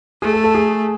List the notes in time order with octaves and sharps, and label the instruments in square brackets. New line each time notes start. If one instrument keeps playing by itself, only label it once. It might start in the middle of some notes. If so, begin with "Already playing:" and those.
[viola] A3 [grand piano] G#4
[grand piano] A4
A4
G#4